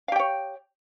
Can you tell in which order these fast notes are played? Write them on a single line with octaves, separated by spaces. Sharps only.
F5 G4 G5 C#5